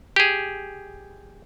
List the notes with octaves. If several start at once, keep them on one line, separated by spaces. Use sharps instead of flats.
G4 G#4